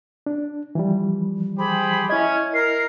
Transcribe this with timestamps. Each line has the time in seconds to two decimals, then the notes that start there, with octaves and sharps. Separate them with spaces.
0.26 D4
0.75 E3 F3 G3
1.59 G4 G#4 C5 B5
2.10 C#4 E4 D#5 G#6
2.54 A#4 C7